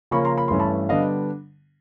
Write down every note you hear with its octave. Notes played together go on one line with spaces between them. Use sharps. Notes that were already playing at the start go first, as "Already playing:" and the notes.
C#3 F3 A#3 C#4 B5 C#6
A#5 C6
B5
G2 E3 A3 C#4 C6
A5 B5
D3 G3 B3 D4 D#5 F5